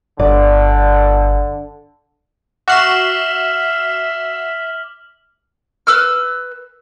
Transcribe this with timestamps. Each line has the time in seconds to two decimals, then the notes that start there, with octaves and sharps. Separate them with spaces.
0.19 G1 D3 D5
2.68 F#4 E5 D6 F6 C7 E7 F#7
5.87 B4 E6 F6